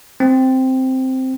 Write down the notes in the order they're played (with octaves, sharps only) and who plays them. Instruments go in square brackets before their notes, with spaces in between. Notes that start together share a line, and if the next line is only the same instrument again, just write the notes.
[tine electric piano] C4